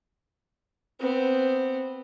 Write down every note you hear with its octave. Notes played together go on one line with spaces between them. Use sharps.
B3 C4